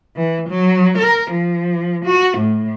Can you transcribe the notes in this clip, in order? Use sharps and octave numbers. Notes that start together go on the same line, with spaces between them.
E3
F#3
A#4
F3
F#4
A2